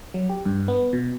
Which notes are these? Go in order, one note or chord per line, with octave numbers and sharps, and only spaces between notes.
F#3
G4
G2
B3
B2